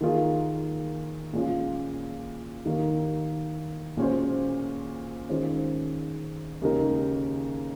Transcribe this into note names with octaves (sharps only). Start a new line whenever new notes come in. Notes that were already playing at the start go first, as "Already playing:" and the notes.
D#3 A#3 F4 G#4
A#2 G#3 C#4 F4
D#2 D#3 A#3
A#2 G#3 C#4 F#4 C5
D#3 G#3 C#4 F4 C5
D#2 C#3 G#3 D#4 A#4